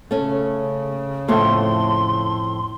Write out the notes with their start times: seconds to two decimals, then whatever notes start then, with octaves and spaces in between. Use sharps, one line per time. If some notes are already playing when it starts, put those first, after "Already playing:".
0.11 C#3 A3 C#4
1.28 F2 A2 A3 C6